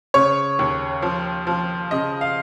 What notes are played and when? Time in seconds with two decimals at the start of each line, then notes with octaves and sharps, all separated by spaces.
0.14 C#3 C#5
0.59 D#2
1.02 F3
1.47 F3
1.91 C#3 D#5
2.21 F5